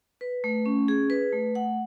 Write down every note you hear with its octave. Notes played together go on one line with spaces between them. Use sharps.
B4
A3
C#4
G#4
B4
A3
F#5